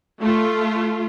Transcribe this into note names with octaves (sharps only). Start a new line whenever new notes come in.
A3 F4